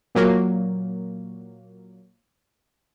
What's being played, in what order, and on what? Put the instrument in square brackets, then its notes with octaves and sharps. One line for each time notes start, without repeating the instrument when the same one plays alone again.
[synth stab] A#2 F#3 A#3